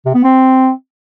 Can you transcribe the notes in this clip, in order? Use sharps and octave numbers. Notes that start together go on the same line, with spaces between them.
C3
B3
C4